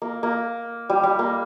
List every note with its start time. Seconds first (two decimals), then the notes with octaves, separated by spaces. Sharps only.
0.02 A#3
0.23 A#3
0.89 G3
1.03 G3
1.19 A#3